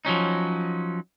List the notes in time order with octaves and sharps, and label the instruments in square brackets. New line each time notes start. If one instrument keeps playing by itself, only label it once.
[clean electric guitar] F3 F#3 C#4 D#4